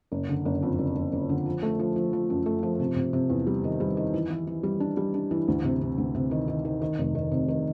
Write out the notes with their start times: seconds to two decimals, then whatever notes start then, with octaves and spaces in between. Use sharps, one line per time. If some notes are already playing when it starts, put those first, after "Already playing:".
0.12 F#1
0.29 D3
0.45 F#1
0.62 F2
0.79 F#1
0.96 F#1
1.12 F#1
1.29 D3
1.46 F3
1.63 A3
1.79 F3
1.96 F3
2.13 F3
2.30 F#2
2.46 A3
2.63 F3
2.80 C3
2.96 C3
3.13 C3
3.30 E2
3.47 G3
3.64 D#3
3.80 G3
3.97 D#3
4.14 E3
4.30 E3
4.47 E3
4.63 G3
4.80 D4
4.97 G3
5.14 D4
5.31 E3
5.48 D2
5.64 C3
5.81 C3
5.98 D2
6.15 C3
6.31 D#3
6.48 D#3
6.65 D#3
6.81 D#3
6.98 F1
7.15 D#3
7.31 C3
7.48 D#3